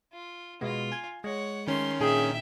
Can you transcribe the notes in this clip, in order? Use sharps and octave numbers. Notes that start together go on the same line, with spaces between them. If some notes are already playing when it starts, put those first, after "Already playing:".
F4
B2 G#3 B3 F4
G#5 G#6
G#3 C#5 F#5
D#3 A3 C#4 C6
A#2 D4 D#4 G#4 E5 G5